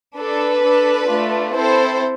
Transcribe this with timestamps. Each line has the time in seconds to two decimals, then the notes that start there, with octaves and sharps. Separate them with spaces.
0.18 D4 A4 B4
0.64 D4 A4
1.09 A3 D4 F4
1.55 C4 E4 A4 C5